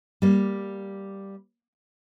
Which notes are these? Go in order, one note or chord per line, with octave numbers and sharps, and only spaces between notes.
G3 A#3